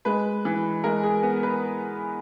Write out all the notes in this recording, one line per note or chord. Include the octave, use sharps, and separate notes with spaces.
G#3 B4
E3
G#3 A#4
G#4
B3
B4